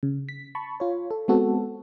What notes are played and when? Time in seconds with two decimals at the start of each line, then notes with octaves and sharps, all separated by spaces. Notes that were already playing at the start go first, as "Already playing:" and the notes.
0.03 C#3
0.29 B6
0.55 A5 B5 C#6
0.80 F4 C#5
1.11 A4
1.28 G#3 B3 C4 F#4 A4